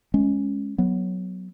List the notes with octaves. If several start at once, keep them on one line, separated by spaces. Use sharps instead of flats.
G#3 C#4
F#3 B3